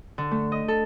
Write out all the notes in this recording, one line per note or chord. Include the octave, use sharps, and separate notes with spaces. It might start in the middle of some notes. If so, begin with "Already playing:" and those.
D3
A3
D#5
A4